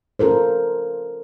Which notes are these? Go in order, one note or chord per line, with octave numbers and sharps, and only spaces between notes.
C#4 F4 A4 A#4 C5